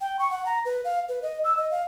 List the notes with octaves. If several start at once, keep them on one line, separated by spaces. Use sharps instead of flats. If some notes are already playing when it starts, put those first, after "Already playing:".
G5
C#6
F#5
A#5
B4
F5
B4
D#5
E6
D#5
F5